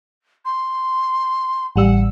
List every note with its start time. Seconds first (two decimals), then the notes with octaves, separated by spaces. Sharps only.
0.45 C6
1.76 A1 G3 F#5 E6